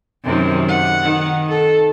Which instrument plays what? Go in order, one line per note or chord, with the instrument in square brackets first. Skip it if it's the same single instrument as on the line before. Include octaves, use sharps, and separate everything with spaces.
[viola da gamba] F#2 C3 D#3
[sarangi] F#5
[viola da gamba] D#3
[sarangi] A4